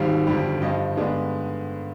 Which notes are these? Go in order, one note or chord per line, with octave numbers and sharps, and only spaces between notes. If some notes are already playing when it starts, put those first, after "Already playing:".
Already playing: G#1 G#2 D#3 G3 F5
G1 F2 D3 G3
G2 D3 F3 D#5
G2 D3 G#3 B3 D5